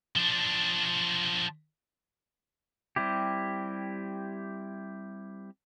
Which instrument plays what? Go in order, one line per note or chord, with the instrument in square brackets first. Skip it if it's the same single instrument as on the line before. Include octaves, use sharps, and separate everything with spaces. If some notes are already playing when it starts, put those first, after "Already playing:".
[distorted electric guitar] F3 D4
[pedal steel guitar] G3 C4 E4 G4